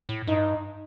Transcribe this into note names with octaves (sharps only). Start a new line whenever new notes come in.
A2
G2 D#4